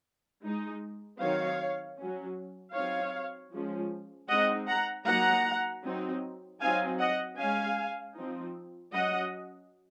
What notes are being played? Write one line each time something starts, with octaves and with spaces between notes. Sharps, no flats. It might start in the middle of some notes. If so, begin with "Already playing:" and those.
G#3 D#4
D#3 F#3 C4 D#4 C#5 F5
F#3 C#4
F#3 C4 D#4 C#5 F5
F3 G#3 C#4
G#3 C4 D#4 D#5 F#5
F#5 A#5
F#3 A#3 D#4 F#5 A#5
F#3 C4 D#4
F#3 C4 D#4 F5 G#5
D#5 F#5
G#3 C#4 F5 G#5
F3 C4 D#4
F#3 C#4 D#5 F#5